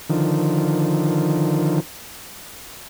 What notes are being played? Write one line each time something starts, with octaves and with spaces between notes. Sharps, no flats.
D3 D#3 F3